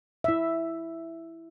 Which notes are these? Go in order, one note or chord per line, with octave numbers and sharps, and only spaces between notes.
E4 E5